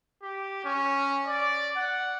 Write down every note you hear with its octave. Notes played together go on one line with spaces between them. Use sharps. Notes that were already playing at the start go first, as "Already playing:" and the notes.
G4
C#4
D5
F#5